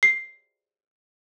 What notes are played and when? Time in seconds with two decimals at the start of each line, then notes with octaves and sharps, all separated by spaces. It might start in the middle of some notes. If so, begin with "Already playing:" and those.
0.03 C7